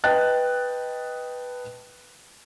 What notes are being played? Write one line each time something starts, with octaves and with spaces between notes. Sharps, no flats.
B4 D#5 G5 A5 F#6 A6